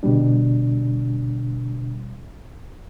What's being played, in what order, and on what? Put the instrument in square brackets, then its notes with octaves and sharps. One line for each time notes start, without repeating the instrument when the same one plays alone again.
[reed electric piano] B2 D3 G3 D4